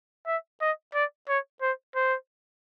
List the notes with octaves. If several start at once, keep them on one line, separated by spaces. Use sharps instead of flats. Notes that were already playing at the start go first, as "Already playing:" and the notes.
E5
D#5
D5
C#5
C5
C5